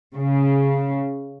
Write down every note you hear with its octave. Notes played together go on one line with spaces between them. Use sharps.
C#3